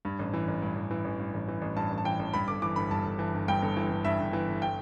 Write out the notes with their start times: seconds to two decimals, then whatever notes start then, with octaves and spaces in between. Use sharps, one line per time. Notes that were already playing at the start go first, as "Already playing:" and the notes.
0.05 G2
0.19 A1
0.33 E3
0.48 A1
0.62 G2
0.76 A1
0.91 E3
1.05 A1
1.19 G2
1.34 A1
1.48 E3
1.62 A1
1.76 G2 A5
1.91 A1
1.98 A5
2.05 E3 G5
2.19 A1
2.33 G2 B5
2.48 G1 D6
2.62 E3 D6
2.76 G1 B5
2.91 G2 A5
3.05 G1
3.19 E3
3.34 G1
3.48 G2 G5
3.62 G1
3.77 E3
3.91 G1
4.05 G2 E5
4.20 G1
4.33 E3
4.48 G1
4.62 G5